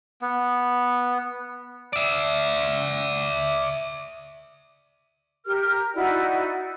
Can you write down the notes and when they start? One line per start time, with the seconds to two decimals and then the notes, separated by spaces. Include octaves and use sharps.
0.22 B3
1.93 D5 E5
5.45 G4 A#4 F6
5.95 D#4 E4 F#4 D5